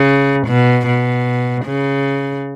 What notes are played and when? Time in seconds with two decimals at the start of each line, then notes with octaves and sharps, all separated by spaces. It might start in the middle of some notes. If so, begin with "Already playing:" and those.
Already playing: C#3
0.47 B2
0.87 B2
1.65 C#3